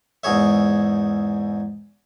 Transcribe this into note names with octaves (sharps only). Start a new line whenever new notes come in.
E2 G#2 G#4 C#5 E5